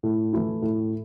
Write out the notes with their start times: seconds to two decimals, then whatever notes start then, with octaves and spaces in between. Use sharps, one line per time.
0.03 A2
0.33 E3 A3 E4
0.62 A2